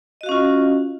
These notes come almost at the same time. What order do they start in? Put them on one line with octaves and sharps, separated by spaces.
D#5 F#4 F5 C#4 F4